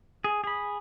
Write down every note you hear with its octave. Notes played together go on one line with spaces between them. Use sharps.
G#4
G#4 B5